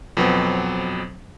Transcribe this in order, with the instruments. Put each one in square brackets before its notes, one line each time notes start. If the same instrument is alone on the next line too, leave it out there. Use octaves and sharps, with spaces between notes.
[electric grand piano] F2 B2 F#3 B3 C4